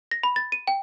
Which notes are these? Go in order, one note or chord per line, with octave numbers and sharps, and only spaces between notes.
A#6
B5
A6
D#7
G5